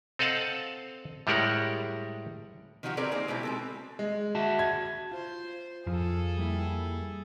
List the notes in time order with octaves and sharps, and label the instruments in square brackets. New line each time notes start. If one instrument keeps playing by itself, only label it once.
[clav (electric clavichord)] C4 A4 D#5 F5 F#5 A5
A2 G3 G#3 G4 A#4 F#5
[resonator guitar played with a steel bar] D#3 F3 D#4 F#4 G4
D3 C4 G#4 A#4 B4 D5
A#3 D#4 G#4 C5
B2 G#3 E4 G4
G#3 C4 A4
[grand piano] G#3
[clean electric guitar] F#4 E5 A5
[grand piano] G#6
[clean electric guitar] F4 [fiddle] C5
[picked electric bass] F2 [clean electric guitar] F3 F4 [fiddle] G#4 A4
[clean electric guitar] G3 A#3 E4